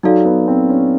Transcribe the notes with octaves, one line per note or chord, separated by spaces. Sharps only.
F#3 D#4 F#4 A4 D5 F5
B3
C4
C#4